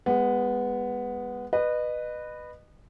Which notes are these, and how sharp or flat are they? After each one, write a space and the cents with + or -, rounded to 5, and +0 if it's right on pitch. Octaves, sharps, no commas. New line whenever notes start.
G#3 -25 B3 +0
B4 +0 D#5 -30